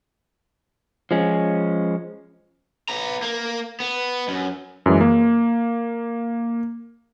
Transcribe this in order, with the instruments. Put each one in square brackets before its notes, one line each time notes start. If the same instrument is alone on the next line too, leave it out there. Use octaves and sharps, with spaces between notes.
[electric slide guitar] F3 G#3 C#4
[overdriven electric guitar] B3 A#5
A#3
B3
F#2
[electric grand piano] F#2 E3 G#3
A#3